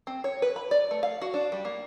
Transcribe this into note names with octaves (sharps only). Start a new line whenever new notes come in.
C4
C#5
B4
B5
D5
A3
F5
F#4
D4
G3
A#3